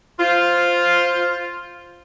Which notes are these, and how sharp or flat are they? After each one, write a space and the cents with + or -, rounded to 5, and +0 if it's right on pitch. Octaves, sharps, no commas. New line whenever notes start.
F4 +0 C5 +0 F5 +0